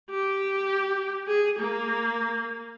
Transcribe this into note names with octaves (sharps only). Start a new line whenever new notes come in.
G4
G#4
A#3